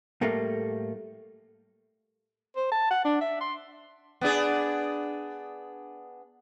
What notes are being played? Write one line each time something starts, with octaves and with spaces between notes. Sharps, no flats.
A2 G3 A3 A#3
C5
A5
F#5
D4
E5
C6
B3 D4 G#4